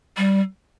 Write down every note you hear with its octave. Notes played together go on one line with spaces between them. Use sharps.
G3